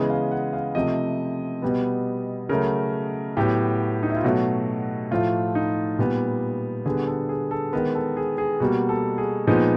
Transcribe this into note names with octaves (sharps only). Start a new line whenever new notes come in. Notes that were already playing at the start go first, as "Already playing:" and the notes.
Already playing: C#3 E3 G#3 B3 D#5
F5
F#5
F5
C3 F3 A3 D#5
B2 G3 B3
C#3 F#3 A3 A#4
A2 F#3 B3 G4
D#4
E4
F4
B2 F#3 A3 F#4
A2 F3 A3 F4
D#4
A#2 G3 B3
D3 G3 B3 G#4
A4
G#4
A4
D#3 G#3 B3 A#4
A4
G#4
G#4
B2 G3 A#3 F#4
A4
G#4
A#2 F3 G#3 B3 D#4